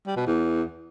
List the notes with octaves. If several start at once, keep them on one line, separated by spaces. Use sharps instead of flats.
G3
B2
E2